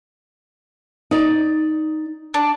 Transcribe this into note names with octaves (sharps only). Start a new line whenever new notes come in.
D#4 D5
D4